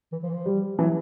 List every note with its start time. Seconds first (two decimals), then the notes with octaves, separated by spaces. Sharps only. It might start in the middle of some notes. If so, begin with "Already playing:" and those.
0.12 E3
0.23 F3
0.29 E3
0.34 F3
0.46 G3
0.79 E3 F#3